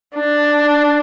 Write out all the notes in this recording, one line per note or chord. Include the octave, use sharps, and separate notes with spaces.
D4